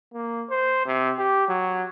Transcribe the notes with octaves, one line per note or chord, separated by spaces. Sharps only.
A#3
C5
C3
G4
F#3